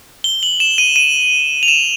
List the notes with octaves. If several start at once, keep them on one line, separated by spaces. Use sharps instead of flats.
G7
F#7
E7
D#7
D#7
F7
E7